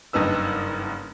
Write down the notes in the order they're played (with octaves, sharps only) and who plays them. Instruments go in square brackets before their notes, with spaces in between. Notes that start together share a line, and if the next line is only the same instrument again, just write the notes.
[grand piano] F#1 G2 D#4 B4 E6